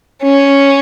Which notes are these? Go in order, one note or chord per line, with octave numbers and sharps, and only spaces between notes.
C#4